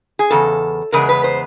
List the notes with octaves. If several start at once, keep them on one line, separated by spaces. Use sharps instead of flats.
G#4
E2 C#3 A4
E2 C#3 G#3 B3 A#4
B4
C5